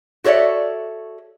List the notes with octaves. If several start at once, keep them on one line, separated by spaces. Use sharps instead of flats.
F#4 A4 C#5 D5 E5